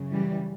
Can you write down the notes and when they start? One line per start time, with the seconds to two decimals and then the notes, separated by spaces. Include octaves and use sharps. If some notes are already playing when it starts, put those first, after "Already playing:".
Already playing: F#2 C#3
0.12 E3 G3